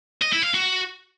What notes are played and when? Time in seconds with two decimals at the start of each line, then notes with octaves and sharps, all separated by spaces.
0.22 D#5
0.33 E4
0.44 F5
0.54 F#4